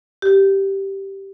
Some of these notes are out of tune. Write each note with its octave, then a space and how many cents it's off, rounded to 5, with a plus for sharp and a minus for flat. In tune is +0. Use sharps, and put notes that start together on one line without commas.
G4 -5